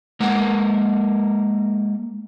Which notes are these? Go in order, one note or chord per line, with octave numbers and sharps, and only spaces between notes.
G#3 A#3 A#4 F#5